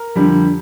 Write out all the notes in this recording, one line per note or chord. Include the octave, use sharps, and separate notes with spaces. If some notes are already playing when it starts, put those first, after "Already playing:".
Already playing: A#4
F2 D3 G3